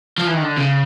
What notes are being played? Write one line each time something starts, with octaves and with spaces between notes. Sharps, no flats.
F3
E3
D#3
D3
C#3